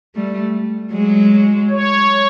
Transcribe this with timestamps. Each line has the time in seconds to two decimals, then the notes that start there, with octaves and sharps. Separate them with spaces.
0.15 G3 A3
0.92 F#3 G#3
1.70 C#5